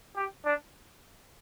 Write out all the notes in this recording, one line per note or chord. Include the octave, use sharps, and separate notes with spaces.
G4
D4